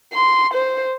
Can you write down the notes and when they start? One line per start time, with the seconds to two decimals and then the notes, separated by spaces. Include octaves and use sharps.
0.13 C6
0.54 C5